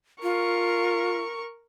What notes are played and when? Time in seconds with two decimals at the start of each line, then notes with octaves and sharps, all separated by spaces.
0.23 F4 A#4 C#6